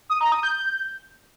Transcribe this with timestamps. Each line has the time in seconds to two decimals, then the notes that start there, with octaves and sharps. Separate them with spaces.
0.09 D#6
0.21 A#5
0.32 D#6
0.43 G6
0.54 G6